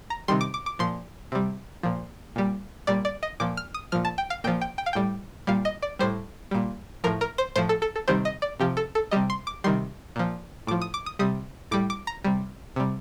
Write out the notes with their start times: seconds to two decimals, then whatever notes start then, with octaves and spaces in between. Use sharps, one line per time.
0.10 A#5
0.28 C3 D#3 G3 C6
0.41 D6
0.54 D6
0.66 D6
0.79 A#2 F3 C6
1.32 C3 G3
1.83 A#2 F3
2.36 A#2 G3
2.87 A#2 G3 D5
3.05 D5
3.23 D#5
3.40 A#2 F3 D6
3.57 F6
3.74 D#6
3.92 A#2 F3 F6
4.05 A5
4.18 G5
4.30 F5
4.44 A#2 G5
4.47 F3
4.61 G5
4.78 G5
4.86 F5
4.93 A2 G3 G5
5.47 A#2 G3 F5
5.65 D#5
5.82 D5
5.99 A2 G3 C5
6.51 A#2 G3
7.04 A2 F3 A#4
7.21 A#4
7.38 C5
7.56 A2 F3 C5
7.69 A4
7.82 A4
7.96 A4
8.08 C3 D#3 G3 C5
8.25 D#5
8.42 D5
8.60 C3 F3 G4
8.77 A4
8.95 A4
9.11 C3 G3 D#5
9.30 C6
9.47 D6
9.64 C3 D#3 G3 C6
10.16 A#2 F3
10.67 A2 D6
10.71 F3
10.82 D#6
10.94 D6
11.06 D#6
11.19 C3 G3 D#6
11.71 A2 G3 D6
11.90 D6
12.07 A#5
12.24 C3 G3
12.76 C3 G3